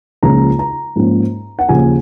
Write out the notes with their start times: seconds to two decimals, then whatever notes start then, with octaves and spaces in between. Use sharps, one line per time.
0.22 C#2 C#3 F3 A#3 A#5
0.59 A#5
0.96 G#2 F3 A#3 C#4
1.59 F#5
1.69 D#2 C#3 F3 G#5